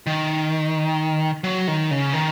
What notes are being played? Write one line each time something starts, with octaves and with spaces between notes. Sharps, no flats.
D#3
F#3
D#3
C#3
D#3